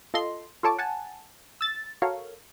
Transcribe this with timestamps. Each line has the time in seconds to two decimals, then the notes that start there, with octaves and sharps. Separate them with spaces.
0.14 F4 A4 D#5 C6
0.63 F4 A4 C#5 A5 D6
0.79 F#5 G#5 A5
1.61 E6 A6
2.02 F#4 A4 A#4 C#5 F5